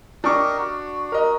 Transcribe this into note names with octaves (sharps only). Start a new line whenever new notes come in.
D4 G4 A#4 D#5 C#6
F#4
A#4 D#5